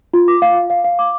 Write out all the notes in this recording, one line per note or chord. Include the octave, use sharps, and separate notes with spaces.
F4
D6
F5
F5
F5
F5
D6